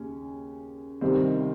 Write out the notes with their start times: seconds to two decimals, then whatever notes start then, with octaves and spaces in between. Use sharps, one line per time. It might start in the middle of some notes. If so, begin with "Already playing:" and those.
Already playing: D#2 C#3 C#4
1.01 C2 C3 D#3 G3 C4